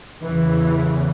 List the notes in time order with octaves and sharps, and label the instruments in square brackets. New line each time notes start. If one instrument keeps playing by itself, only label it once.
[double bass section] E2 C#3 E3